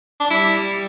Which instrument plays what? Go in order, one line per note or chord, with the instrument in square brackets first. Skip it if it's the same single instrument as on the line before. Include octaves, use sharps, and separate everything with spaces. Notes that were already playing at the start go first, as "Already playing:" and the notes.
[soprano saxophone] D4
[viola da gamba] G3 [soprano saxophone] E4